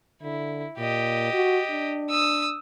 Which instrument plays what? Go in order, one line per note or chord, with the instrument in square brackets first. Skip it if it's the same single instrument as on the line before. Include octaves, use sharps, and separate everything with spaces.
[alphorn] D3 [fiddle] E4
[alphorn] A#2 [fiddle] G4 D#5
[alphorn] F#4
D4
[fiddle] D#6 E6